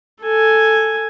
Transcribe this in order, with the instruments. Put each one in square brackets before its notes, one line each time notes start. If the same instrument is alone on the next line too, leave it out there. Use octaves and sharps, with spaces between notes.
[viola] A4 G#5